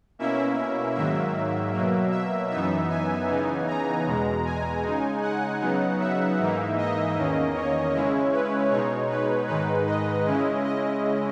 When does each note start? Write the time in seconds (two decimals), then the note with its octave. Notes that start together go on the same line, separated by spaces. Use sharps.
0.19 B2 A#3 C#4 E4 E5
0.95 G#2 D#3 F#3 A#3 E5
1.74 B2 F#3 A#3
2.12 E5
2.50 F#2 E3 B3 D#4 E5
2.89 G#5
3.28 C#3 E3 B3 D#4
3.67 A#5
4.06 E2 B2 G#3
4.45 G#5
4.83 C#3 G#3 D#4
5.22 F#5
5.61 C#3 F#3 B3 D#4
5.99 E5
6.39 G#2 E3 A#3 D#4
6.78 D#5
7.16 E2 D#3 A#3 C#4
7.55 C#5
7.93 C#3 G#3 C#4 E4
8.32 B4
8.71 B2 G#3 D#4 C#5
9.09 B4
9.48 G#2 D#3 G#3 D#4 B4
9.87 D#5
10.26 C#3 G#3 C#4 E4
10.65 D#5